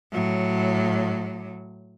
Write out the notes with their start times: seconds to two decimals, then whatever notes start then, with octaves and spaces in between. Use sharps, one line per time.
0.12 A2 F#3